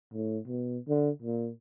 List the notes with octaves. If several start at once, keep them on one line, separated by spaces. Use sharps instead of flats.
A2
B2
D3
A#2